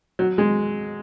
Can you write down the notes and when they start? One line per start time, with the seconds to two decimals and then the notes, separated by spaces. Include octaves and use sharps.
0.19 F#3
0.38 G#3